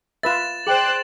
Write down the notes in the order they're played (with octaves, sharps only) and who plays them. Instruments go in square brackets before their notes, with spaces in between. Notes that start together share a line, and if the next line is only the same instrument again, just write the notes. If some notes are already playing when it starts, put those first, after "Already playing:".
[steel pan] F4 B4 E5 [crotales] A6 E7
[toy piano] G#4 G5 [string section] C5 D5 F#6